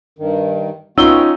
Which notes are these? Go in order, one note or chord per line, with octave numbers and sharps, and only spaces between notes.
G2 D#3
B3 C#4 D#4 F4 F#4 G5 E6 G7